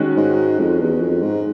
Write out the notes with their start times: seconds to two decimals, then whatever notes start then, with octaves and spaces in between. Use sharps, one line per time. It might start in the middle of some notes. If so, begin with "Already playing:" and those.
Already playing: D#3 G#3 C#4 F#4
0.17 G#2
0.59 F2
0.81 E2
1.01 F2
1.22 G#2